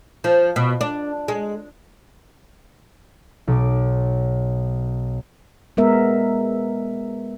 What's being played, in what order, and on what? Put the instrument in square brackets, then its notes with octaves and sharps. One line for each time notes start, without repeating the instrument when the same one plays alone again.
[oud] F3
B2
D4
G#3
[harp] B1 D6
[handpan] G#3 B3 A#4 E5